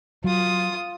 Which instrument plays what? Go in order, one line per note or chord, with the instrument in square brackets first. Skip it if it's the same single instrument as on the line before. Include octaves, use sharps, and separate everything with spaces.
[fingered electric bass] F#3 [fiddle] F4 D#6